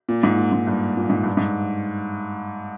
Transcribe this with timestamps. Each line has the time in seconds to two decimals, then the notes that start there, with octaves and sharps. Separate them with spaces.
0.09 A#2
0.23 G#2
0.37 A#2
0.53 G#2
0.67 G2
0.97 A#2
1.10 G#2
1.23 G2
1.37 G#2